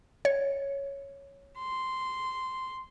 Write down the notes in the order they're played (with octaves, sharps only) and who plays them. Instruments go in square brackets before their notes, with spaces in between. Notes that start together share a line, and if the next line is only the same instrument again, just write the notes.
[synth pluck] C#5
[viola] C6